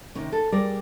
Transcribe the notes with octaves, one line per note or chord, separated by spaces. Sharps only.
C3 D#3 C#4
A4
G3 G#4 A#4 D5